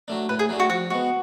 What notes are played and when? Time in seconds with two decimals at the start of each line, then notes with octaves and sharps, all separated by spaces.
0.08 F#3 A3 D4
0.29 A2 B4
0.39 G#4
0.49 F#3 A3 D4
0.60 F#4
0.70 F3 F#4
0.90 G#3 B3 F#4